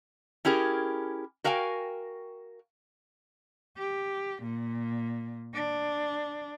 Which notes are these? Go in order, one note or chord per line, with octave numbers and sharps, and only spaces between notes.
C#4 E4 G4 G#4 A#4
F#4 A#4 F5 G5 G#5
G4
A#2
D4